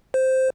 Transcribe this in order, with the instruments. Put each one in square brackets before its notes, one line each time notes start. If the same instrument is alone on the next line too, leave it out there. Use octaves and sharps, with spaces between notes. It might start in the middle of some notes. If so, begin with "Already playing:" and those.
[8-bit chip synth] C5